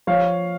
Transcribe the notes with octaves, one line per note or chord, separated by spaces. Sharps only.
F3 C#5 F5